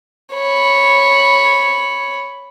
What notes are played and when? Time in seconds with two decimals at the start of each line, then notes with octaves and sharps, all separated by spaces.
0.34 C#5 B5